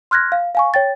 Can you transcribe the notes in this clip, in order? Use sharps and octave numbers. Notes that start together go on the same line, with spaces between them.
C6 F6 F#6 G#6 A#6
F5
F5 G#5 C#6
C#5 G5 A6